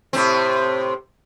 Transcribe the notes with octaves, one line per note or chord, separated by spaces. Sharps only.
A2 C3 C4